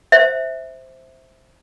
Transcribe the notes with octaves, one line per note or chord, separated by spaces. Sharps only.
C5 E5